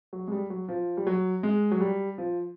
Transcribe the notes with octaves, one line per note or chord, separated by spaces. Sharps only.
F#3
G#3
G3
F#3
F3
G3
F#3
G#3
F#3
G3
F3